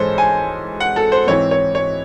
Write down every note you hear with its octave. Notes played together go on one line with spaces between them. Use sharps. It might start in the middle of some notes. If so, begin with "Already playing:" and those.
Already playing: G#2 E3 G#3 C#4 A4 C5
G#5
F#5
A4
C5
G#2 E3 C4 E4 C#5
C#5
C#5